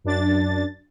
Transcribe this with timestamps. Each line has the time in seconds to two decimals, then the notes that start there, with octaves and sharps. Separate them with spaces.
0.04 F#2 D4 A6